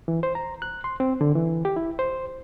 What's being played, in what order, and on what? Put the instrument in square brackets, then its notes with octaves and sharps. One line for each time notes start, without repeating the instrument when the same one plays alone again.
[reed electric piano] E3
C5
A#5
F#6
C6
C4
D3
E3
G4
E4
C5